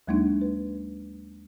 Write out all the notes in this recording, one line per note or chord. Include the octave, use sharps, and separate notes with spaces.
D#2 F#3 G#3 A#3 D4 D#4
B4